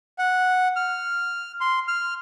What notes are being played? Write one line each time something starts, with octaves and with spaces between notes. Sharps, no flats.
F#5
F6
C6
F6